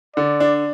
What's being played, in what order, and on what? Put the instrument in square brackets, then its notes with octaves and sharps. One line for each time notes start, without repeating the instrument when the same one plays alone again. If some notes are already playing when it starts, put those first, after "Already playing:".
[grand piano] D3 [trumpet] D5
[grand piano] D4